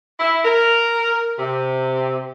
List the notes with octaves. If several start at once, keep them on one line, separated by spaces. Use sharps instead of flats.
E4
A#4
C3